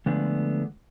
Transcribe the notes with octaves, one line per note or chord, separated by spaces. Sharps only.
D3 F3 G#3 A3 B3 D4